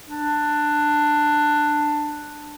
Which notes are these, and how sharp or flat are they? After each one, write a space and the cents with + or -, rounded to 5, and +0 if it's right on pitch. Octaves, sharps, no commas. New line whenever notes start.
D4 +10